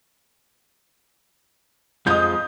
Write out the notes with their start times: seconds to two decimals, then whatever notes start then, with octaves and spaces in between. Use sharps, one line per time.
2.07 F2 F3 G#3 D#6 G6